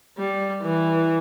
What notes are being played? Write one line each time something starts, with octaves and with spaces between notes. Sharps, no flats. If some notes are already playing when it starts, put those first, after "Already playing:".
G3
E3